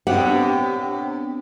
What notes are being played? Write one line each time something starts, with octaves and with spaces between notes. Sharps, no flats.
A2 C3 B3 C4 D4 G4 F#5